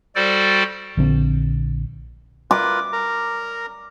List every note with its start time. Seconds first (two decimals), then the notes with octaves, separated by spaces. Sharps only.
0.15 G3 F#4 A4 C5 D5 G5
0.97 A#1 D3 C4
2.51 F4 A#4 B4 D6
2.93 A#4 A#5